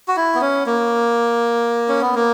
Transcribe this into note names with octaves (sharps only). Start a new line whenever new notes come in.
F#4
E4
B3
C#4
A#3
C#4
B3
A#3